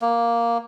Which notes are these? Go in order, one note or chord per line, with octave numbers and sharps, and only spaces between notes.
A#3